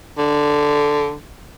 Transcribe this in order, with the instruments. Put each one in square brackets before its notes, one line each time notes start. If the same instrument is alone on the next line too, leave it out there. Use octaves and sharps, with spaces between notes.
[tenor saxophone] D3